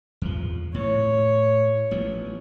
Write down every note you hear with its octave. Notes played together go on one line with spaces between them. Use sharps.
E2 F3
A2 C#5
A1 F3 B3